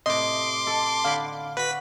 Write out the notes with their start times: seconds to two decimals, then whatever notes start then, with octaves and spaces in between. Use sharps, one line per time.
0.06 A2 C3 D#5 C6 D6
0.67 A4
1.04 D3 F5 B5
1.57 F#4 B4 B6